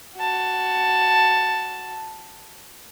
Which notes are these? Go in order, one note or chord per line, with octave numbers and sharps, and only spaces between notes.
F#4 A5